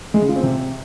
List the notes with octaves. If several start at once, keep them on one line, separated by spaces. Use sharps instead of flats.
G#3
C#3
F4
C4
C3